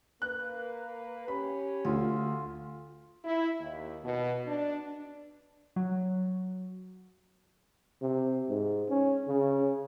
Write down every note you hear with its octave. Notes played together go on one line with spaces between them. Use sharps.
A#3 B4 F#6
C#4 G4 B5
D2 F4
E4
D#2
B2
D4
F#3
C3
G#2
C#4
C#3